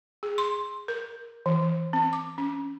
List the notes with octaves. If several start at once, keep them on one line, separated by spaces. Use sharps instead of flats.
G#4
C6
A#4
E3
C4
D6
C#4